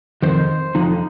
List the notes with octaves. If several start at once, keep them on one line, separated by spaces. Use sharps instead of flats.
F2 D#3 C5
F2 D3 F3 D#4